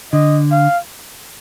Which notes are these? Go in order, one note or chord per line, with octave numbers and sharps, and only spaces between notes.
D3 D#5
F5